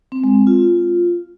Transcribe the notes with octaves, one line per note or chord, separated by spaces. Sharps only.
C4
G#3
C4
F4